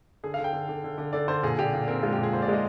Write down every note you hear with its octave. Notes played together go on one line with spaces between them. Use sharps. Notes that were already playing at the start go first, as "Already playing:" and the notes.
D3 G#4
F5
D3
G5
D3
D3
D3
D3
D3 D5
D3 C5
A#2 G#4
A#2 G4
A#2
C4 A#4
G#3 F4
G4
A#2
G#4
A#2 C5
D5
G#3 D#5